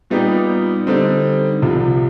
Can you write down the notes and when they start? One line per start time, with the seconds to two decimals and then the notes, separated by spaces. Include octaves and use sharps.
0.10 A#2 G3 B3 D#4 G4
0.87 D3 G3 C4 D#4
1.62 C2 C3 F3